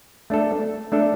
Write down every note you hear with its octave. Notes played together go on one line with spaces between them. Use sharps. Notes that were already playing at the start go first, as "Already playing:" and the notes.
A3 D4 A4
A3 D4 A4